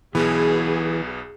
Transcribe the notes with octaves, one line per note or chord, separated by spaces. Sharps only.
B1 B2 E3 B3 G#4